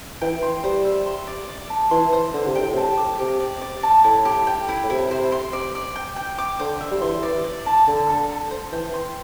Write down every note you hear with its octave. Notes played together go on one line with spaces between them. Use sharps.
E3 G5
C6
G3 C5
E5
C6
D5
D5
A5
E3 C6
C5
D3 C5
C3
A2 G5
C3 A5
D6
C3 G4
D5
D5
A5
A2 E4
G4
G5
E4
A2
C3 E4
C5
C6
D5
D5
G5
G5
D6
D3 C5
E5
G3
E3 C6
D5
D5
A5
D3 A5
A4
A4
C5
E3 G5
C6